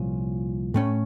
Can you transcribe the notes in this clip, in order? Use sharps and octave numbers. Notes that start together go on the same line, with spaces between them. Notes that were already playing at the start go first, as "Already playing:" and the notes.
Already playing: C2 A#2 F3 C#4
A2 A3 C#4